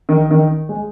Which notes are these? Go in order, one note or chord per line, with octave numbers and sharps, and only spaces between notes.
D#3
D#3
G#3